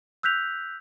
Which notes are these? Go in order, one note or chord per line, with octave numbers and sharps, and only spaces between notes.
E6 F#6 G6 B6 F7